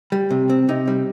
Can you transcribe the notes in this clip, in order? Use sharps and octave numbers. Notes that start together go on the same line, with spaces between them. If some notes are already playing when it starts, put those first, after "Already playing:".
G3
C3
C4
C3 D#4
G3